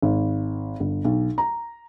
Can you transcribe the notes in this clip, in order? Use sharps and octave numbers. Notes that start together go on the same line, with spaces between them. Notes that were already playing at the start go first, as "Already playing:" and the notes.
G#1
G1
B1
A#5